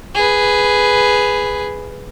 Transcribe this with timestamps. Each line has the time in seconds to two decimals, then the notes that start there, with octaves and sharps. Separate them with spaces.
0.15 G#4 B4